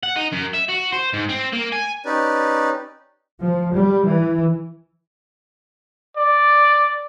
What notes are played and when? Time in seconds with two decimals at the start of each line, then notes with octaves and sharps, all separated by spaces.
0.03 F#5
0.16 D#4
0.32 F#2
0.53 E5
0.68 F#4
0.92 C5
1.13 G#2
1.29 C4
1.53 A#3
1.72 G#5
2.04 C#4 D#4 G4 B4 D5
3.41 F3
3.74 G3
4.06 E3
6.17 D5